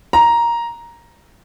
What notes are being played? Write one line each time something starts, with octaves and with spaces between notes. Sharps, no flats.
A#5